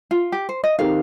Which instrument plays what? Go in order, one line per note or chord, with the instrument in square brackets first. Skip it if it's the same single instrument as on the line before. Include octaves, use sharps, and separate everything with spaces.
[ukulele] F4
G4
C5
D#5
[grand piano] D#3 C4 D#4 G4 A#4 [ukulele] F5